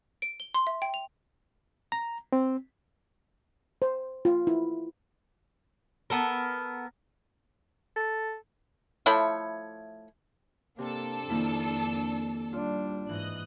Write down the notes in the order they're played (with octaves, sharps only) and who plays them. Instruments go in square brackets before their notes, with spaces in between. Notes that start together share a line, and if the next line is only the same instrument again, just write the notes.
[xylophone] D7
G7
C6
E5
G5
F7
[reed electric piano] A#5
C4
[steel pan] C5
F4
E4
[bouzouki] B3 A4 A#4
[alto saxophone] A4
[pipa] F3 A3 E4 C#5
[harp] C3 [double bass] A#3 [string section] D4 A4
[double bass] F2 [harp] D#3 A#3 E4
[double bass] G3 D4 [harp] F4
[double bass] G#2 [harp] E3 [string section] D#5 F#6